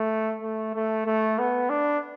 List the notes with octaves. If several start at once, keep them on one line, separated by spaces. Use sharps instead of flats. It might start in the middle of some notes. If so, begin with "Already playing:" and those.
Already playing: A3
A3
A3
A3
B3
D4